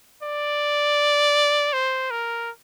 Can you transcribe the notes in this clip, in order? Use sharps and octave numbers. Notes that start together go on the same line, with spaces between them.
D5
C5
A#4